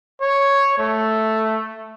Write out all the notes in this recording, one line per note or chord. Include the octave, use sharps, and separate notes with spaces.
C#5
A3